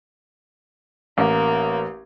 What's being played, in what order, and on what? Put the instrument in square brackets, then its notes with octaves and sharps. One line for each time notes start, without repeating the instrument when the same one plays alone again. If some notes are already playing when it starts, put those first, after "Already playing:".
[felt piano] A1 [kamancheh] A#3